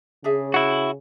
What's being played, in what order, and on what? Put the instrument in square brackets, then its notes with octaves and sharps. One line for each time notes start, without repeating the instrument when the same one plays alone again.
[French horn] C#3 [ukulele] D4 G#4 E5
[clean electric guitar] E4 F#4